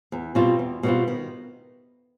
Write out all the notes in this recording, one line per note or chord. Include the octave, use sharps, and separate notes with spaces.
E2
B2 G3 C4 F4
E2
B2 G3 C4 F4
D#3